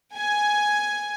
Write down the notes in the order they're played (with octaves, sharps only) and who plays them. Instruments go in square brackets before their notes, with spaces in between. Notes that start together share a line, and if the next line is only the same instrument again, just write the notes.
[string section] G#5